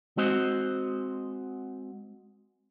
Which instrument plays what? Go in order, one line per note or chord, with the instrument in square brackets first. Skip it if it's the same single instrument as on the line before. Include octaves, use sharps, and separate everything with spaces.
[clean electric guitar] G#3 C4 F#4 C5 D#5